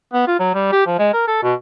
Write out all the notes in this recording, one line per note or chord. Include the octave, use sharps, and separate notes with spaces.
B3
F4
F#3
G3
G4
F3
G#3
A#4
A4
B2